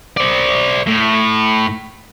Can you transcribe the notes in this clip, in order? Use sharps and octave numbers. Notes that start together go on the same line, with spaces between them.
C5 D5
A2